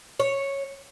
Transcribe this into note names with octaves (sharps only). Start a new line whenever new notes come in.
C#5